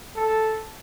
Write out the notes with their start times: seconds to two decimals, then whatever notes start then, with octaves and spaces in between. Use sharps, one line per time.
0.16 A4